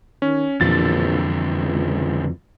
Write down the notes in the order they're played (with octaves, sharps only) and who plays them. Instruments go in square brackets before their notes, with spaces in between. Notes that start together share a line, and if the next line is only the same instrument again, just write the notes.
[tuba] D#3 [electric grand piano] C#4
[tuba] A#1 [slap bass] F2 B2 E3 [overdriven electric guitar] D3 F3 [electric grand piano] A6
[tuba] C#2